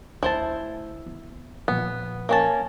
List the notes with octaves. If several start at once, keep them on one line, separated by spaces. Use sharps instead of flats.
D2 E4 C5 A5
B3
A#2 F3 B3
A#3 C#4 A5